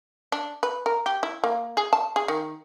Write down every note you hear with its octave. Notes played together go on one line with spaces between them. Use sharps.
D4
B4
A#4
G4
E4
A#3
G#4
A5
G#4
D#3